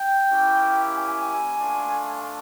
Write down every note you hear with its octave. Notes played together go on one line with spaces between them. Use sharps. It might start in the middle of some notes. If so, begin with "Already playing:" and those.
Already playing: G5
A#3 C#4 E4 G4
G#5
A3 D4 F4